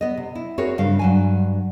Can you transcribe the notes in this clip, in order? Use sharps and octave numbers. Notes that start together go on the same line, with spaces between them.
B3 D#5
C3
E4
C4 F#4 G#4 A#4 C#5
G2 C#3 F5
G2 F#3 G#5